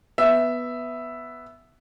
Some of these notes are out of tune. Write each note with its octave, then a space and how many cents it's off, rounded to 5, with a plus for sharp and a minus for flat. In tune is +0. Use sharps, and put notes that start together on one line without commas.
B3 +0 E5 +0